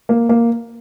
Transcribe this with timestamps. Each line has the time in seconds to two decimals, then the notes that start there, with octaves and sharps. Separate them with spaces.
0.09 A#3
0.29 A#3